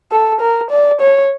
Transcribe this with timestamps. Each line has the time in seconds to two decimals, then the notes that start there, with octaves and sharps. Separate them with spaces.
0.12 A4
0.41 A#4
0.71 D5
1.01 C#5